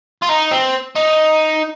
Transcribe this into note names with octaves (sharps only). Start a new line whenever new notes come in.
F4
D#4
C4
D#4